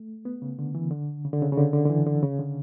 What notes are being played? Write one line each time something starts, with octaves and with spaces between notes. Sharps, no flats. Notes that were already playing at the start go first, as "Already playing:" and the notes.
Already playing: A3
B3
C#3
D3
E3
D3
C#3
D3
C#3
C#3
D3
D3
D3
E3
D3
C#3
D3